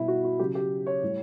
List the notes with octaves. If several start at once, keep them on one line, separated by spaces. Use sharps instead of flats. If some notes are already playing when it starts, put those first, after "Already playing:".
Already playing: B2 G3 E4
F#4
F#4
C#3 F#3 G4
G4
C#5
A2 G3